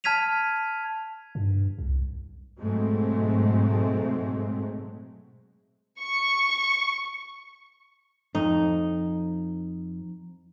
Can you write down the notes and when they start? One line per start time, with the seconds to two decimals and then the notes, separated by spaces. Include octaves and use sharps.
0.04 A5 F6 G#6 B6 D#7 F7
1.35 G2
1.79 C2
2.60 G#2 B2 F#3 G#3 A3 C4
6.02 C#6
8.35 F2 D#4